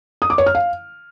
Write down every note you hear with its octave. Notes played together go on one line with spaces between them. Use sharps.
D#6
D6
C#5
F6
F5